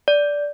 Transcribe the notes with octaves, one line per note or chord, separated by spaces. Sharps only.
D5